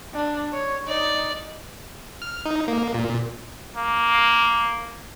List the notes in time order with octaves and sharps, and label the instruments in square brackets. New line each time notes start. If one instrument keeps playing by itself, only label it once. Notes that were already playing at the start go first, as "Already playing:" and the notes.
[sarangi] D4
C#5
[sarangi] D#4 [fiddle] D5
[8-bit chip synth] F6
D#4
A#3
A#2
[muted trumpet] A#3